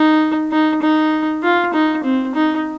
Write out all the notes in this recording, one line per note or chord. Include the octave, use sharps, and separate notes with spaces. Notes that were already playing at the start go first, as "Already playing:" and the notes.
Already playing: D#4
D#4
D#4
F4
D#4
C4
D#4